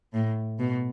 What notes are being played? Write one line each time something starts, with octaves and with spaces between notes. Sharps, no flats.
A2
B2